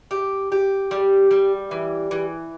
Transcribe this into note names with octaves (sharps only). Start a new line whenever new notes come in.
G4
G4
G3
G3
E3
E3